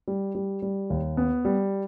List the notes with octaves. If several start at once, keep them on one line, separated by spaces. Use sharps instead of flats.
G3
G3
G3
D#2
B3
G3